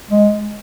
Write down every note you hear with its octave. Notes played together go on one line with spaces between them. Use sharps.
G#3